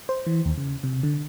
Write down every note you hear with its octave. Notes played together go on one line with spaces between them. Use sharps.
C5
E3
D#2
C#3
C3
D3